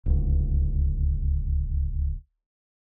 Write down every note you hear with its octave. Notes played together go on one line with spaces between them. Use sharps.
D1 C#2